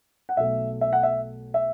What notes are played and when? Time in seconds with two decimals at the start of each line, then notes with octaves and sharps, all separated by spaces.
0.29 F#5
0.37 B1 B2 A3 E5
0.81 E5
0.93 F#5
1.03 E5
1.54 E5